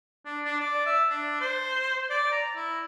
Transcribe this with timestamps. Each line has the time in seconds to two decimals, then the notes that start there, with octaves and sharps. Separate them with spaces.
0.25 D4
0.45 D4
0.60 D5
0.86 E5
1.10 D4
1.41 C5
2.10 D5
2.32 A#5
2.56 E4